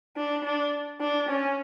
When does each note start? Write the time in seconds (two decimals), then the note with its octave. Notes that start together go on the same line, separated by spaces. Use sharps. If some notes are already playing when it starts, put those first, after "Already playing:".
0.17 D4
0.44 D4
1.01 D4
1.29 C#4